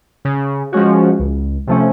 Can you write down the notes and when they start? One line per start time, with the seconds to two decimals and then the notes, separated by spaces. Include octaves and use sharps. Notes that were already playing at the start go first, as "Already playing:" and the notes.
0.25 C#3
0.72 F3 G#3 C#4 F#4
1.19 C#2
1.67 C3 F3 A3 C#4